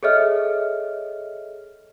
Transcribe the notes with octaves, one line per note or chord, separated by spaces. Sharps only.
G#4 A4 C#5 D#5 E5 F6